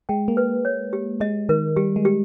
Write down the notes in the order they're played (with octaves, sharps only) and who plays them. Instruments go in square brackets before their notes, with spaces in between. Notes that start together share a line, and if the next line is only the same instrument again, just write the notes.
[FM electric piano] G#3 [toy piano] G5
[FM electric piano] A#3
[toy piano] B4
C#5
G4
[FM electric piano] G#3 [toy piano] D#5
[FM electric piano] D#3 [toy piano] A#4
[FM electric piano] G3 [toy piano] G4
[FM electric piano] G#3
[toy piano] G4